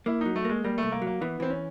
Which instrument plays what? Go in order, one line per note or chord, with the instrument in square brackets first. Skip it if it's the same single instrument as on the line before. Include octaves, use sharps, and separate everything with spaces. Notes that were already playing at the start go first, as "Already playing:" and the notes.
[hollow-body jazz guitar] A#3 [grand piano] E4
[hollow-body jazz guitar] F#3 [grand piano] D#4
[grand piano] A3
[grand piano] G#3 [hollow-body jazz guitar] A#3
[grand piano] G3 [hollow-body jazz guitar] A#3
[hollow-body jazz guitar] C2 [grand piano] A3
[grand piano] A#3
[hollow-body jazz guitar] F#3
[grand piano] A#3
[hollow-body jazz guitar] E3 [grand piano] B3
[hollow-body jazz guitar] E3 [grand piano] C4
[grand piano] C#4